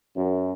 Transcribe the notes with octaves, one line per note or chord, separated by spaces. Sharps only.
F#2